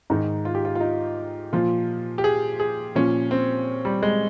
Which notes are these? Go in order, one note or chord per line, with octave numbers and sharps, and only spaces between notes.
G#2 D#3 D#4
F4
G4
F4
F4
D#4
A#2 F3 F4
G4
G#4
G#4
A#2 F3 C#4
C4
G3
G#3